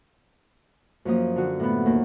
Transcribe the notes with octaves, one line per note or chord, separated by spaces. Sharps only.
F#2 F3 A#3 D#6
D3 F#4
A2 B3
D#2 A#3